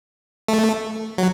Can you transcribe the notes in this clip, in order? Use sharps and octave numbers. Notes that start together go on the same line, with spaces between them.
A3
F#3